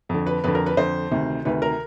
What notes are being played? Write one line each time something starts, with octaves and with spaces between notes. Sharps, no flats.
F2 D3
B4
F2 D3 B4
A#4
B4
F2 D3 C5
D2 C3 D#3
D2 C3 D#3 B4
A#4